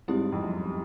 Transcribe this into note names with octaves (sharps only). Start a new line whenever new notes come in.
G#2 G3 C4 E4 G4
F2
F#2